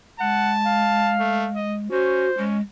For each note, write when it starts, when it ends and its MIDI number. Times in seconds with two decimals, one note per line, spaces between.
0.20 1.89 56
0.20 0.53 78
0.20 1.13 81
0.65 1.59 77
1.20 1.47 57
1.56 1.77 75
1.91 2.26 61
1.91 2.30 66
1.91 2.45 72
2.38 2.61 56
2.38 2.57 61